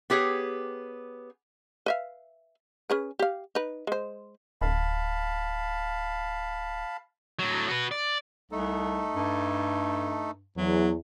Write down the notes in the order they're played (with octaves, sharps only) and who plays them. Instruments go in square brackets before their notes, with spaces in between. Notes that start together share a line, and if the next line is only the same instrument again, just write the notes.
[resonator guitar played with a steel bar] B3 G4 G#4 C#5
[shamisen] B4 E5 F5
C#4 G#4 B4
G4 F5
D#4 B4
G#3 C5
[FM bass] D1 [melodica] F5 A5 B5
[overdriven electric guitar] A2 F#3
F#4 B4
D5
[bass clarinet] C2 [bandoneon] A3 D#4 A4
[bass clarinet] G2
[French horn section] E2 [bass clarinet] F#3